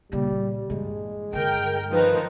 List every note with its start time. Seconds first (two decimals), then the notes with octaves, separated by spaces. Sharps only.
0.12 A#2 C#3 G3
0.70 G2 E3 G#3
1.33 G2 D3 A#4 G5
1.93 D#3 F3 D#4 B4